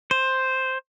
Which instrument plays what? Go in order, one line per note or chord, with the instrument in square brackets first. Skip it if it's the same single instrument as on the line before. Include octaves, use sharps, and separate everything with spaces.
[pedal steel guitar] C5